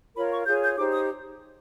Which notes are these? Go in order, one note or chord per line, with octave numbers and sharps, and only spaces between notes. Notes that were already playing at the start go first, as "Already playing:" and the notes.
F4 A#4 C#5 B5
C#6
F4 G#4 C#5 G6
G6
D#4 G4 C5 D6
D#6